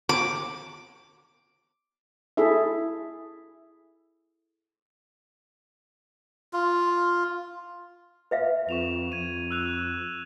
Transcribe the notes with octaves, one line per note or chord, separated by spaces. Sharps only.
D6
E4 G#4 A4 E5
F4
B4 E5 F5
F2 C#6 E7 F7
F2 G#6 D#7
E6 F#6 F7